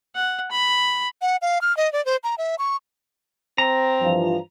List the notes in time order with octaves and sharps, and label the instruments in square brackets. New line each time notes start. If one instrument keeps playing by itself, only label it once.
[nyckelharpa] F#5
B5
[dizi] F#5
F5
F6
D#5
D5
C5
A#5
E5
C#6
[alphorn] C4 [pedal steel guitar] A#5
[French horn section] G2 E3 F3